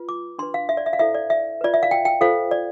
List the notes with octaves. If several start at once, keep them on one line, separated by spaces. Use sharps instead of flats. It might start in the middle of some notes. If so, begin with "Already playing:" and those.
Already playing: F4 B4
D6
D4 G4 B4 C6
F5
E5
D5
E5
F5
E4 A4 C5 E5
D5
E5
F4 B4 D5
E5
F5
G5
G5
F4 A4 C5 F5
D5